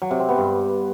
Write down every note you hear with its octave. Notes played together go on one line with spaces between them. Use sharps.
F#3
C3
C4
B3
G2